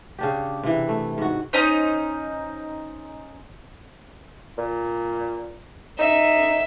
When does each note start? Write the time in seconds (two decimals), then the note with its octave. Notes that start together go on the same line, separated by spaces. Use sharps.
0.19 C#3 D4 G4
0.63 C3 E3
0.89 A3
1.18 G#2 F#4
1.53 C#4 D#4 C5
4.58 A#2
5.99 D#4 E5